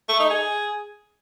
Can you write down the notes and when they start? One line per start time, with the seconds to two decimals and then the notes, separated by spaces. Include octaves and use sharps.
0.09 A3
0.20 D#4
0.30 G#4